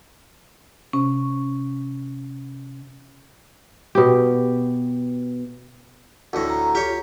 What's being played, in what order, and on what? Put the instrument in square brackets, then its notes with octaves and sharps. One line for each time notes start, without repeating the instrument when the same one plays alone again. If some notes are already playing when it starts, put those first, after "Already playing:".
[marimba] C3 C#4
[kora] B2 G4
[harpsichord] D2 A2
[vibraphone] A#5
[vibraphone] F4 [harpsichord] G4 C#5